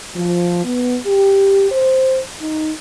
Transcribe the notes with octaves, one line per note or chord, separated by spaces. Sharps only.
F3
B3
G4
C5
D#4